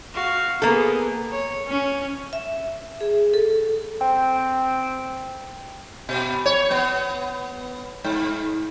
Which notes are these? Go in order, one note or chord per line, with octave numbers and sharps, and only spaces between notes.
F#4 F5
A#3 B3 G#4 A4
C#5
C#4
E5
G#4
A4
C4 G5
B2
C#5
B3
G#2